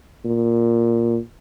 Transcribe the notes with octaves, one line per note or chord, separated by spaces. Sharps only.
A#2